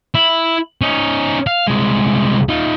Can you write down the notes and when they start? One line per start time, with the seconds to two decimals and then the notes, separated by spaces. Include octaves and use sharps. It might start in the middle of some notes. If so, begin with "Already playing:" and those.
0.15 E4
0.81 C#4 D#4
1.47 F5
1.67 C2 G#3
2.49 D#4 F4